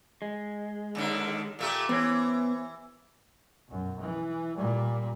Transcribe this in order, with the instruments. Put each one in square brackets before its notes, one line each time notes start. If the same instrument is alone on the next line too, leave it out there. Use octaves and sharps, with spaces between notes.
[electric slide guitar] G#3
[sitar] D#2 D3 D#3
A#2 A3 G4
[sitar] E3 [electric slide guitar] B3 C5 C#5
[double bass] B1 F#2
E3
A#2 G3